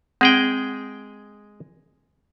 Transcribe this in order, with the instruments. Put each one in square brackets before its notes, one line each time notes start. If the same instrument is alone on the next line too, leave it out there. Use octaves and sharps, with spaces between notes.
[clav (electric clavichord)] G#3 G#4 G5 [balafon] C4